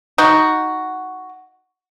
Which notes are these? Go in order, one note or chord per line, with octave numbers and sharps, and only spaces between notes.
D#4 F#4